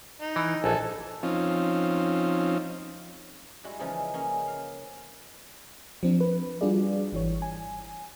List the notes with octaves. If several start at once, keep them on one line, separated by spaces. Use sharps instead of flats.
D#4
E3
A#1 A4 G#5
F3 C4 C#4 D#4 F4
G3 G#3 E4 F#4
C#3 E3 F3 G#3 D#4 G#4
A#3 C#4 G#4
F5
F3 C4 D4
B4
G3 D4 F4 F#4 G#4 D5
G#1 E3 C#5
G#5